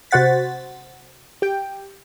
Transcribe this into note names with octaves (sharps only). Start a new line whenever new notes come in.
C3 F#4 C5 F#5 A6 B6
G4 G5